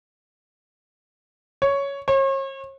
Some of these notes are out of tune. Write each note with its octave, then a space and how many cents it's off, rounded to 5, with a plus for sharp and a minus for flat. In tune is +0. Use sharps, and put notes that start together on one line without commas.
C#5 +5
C#5 -40